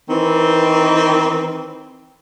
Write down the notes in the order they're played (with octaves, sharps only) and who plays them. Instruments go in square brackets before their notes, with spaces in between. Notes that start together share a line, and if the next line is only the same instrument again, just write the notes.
[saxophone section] D#3 E3 C4